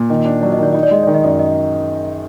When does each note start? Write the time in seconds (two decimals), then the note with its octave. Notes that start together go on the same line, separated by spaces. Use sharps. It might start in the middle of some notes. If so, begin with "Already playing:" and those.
Already playing: A#2
0.10 D#3 D#5
0.25 D4
0.42 F#3 D5
0.52 D#5
0.58 D#3 D5
0.73 D#4 D#5
0.83 D5
0.91 G#3 D#5
1.03 D#3 D5
1.14 D#5
1.24 F#2 D5
1.39 D#5